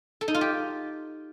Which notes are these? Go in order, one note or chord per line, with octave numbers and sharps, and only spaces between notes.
A4
D#4
F4
G4